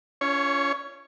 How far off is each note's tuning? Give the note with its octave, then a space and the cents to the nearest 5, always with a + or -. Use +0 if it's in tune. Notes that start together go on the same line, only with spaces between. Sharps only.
C#4 +30 F4 -30 C#5 +0